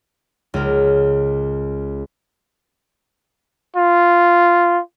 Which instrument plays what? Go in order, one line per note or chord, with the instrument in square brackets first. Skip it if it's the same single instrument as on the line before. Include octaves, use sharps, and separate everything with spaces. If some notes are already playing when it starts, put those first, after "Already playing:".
[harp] C#2 A#4
[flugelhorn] F4